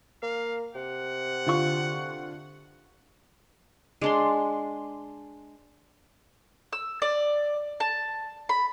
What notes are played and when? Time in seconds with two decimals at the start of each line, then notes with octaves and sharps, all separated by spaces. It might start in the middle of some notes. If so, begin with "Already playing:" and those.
0.22 A#3 F5
0.75 C3 F#5
1.46 D3 F4 C#6
4.01 G#3 D4 C6
6.73 E6
7.02 D5
7.80 A5
8.49 B5